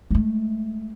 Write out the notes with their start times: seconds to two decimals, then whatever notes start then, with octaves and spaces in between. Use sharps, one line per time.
0.11 G#3 A3